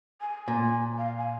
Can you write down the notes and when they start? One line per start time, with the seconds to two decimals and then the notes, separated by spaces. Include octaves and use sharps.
0.21 G#5
0.48 A#2
0.98 F5
1.18 G#5